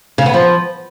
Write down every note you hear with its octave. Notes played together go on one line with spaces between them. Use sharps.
C#3
B3
F3